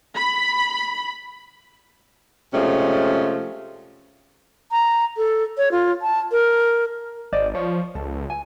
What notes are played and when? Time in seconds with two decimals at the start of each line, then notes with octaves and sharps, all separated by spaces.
0.16 B5
2.54 C3 F3 G#3 A3 C#4
4.71 A#5
5.17 A4
5.58 C#5
5.72 F4
6.02 A5
6.32 A#4
7.33 G#1 C5 D5 D#5
7.55 F3 C#5
7.95 C#2 A4
8.30 G#5